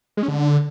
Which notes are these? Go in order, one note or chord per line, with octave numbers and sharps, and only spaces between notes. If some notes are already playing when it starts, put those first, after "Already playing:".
G#3
C#4
D3